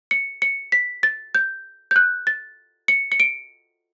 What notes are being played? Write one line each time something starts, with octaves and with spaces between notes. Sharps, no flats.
C#7
C#7
B6
A6
G6
G6
F#6
A6
C#7
C#7
D7